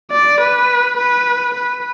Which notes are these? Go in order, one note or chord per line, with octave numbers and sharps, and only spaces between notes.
D5
B4
B4
B4